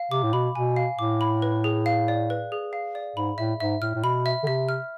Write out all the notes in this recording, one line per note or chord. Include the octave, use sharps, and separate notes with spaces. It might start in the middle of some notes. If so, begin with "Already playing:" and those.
Already playing: F5
C3 D6
A2
B2 B5
B2 G#5
F5
A2 D6
B5
B4
G#4
F5
D5
B4
G#4
F5
D5
G#2 B5
A2 E5
G#2 E5
A2 F6
A2
B2 B5
E5
D3
C3 E5
F6